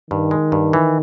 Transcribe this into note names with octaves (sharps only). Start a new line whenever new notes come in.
G2 D#3
G#3
G2
E3